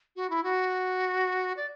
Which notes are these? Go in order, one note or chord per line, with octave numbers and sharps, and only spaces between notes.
F#4
E4
F#4
D5